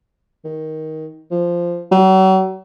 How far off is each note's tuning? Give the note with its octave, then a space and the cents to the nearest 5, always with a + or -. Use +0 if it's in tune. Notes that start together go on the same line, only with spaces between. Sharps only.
D#3 +15
F3 -10
F#3 +40